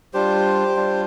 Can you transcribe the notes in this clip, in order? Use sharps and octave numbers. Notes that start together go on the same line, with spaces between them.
G3 D4 F4 G4 C5
G3 D4 F4